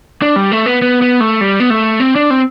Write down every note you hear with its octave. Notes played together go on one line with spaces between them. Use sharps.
D4
G3
A3
B3
B3
B3
A3
G3
B3
A3
C4
D4
C4